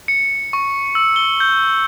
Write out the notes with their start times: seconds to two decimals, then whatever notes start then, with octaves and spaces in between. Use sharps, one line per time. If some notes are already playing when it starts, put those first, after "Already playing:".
0.08 C#7
0.53 C#6
0.95 E6
1.16 G7
1.40 G6